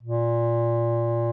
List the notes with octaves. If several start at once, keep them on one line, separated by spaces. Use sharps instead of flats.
A#2